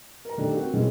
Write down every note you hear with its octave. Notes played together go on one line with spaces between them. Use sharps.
A#4 A#5
D#3 G3 A3 D4
C4 F#4 A#4
B2 E3 G#3 C#4